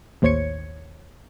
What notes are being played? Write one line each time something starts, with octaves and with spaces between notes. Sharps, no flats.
A1 D#2 C5 C#5 G#6 C#7